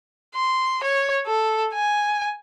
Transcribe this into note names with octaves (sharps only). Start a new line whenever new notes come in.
C6
C#5
A4
G#5